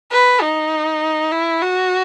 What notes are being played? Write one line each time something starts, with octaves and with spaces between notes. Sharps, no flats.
B4
D#4
E4
F#4